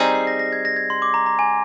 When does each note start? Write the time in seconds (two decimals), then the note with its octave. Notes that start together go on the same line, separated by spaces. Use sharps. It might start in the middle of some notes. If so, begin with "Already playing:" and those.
Already playing: G3 C4 D#4 G#4
0.15 C7
0.27 A#6
0.39 A#6
0.53 G#6
0.65 A#6
0.76 G#6
0.90 C6
1.02 D6
1.14 A#5
1.26 A#5
1.39 G#5